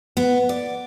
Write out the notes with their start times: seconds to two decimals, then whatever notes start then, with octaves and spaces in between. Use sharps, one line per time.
0.17 B3
0.49 D5